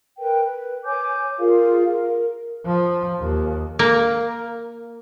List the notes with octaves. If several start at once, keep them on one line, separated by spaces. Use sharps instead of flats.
A#4 B4 G5
B4
C#5 G#5 D6 G6
F4 G#4 A#4 F5
A#4
F3
D#2
A#3